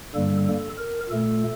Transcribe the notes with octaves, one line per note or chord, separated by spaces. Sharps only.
G2 D3 G3 A#3 A4
A4
A#4
A#2 A3 A4